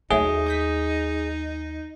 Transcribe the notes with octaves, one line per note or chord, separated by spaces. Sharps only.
D#2 F#3 G#3 A3 D#4 G#4
D#6 G6 B6